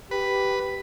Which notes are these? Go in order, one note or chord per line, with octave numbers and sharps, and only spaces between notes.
G4 B4